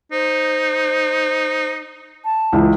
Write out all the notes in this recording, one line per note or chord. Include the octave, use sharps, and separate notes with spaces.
D#4 C5
A5
C#2 E3